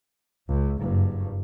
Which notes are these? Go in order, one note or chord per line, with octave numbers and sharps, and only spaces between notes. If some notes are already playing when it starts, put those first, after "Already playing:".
C#2
F#1 G2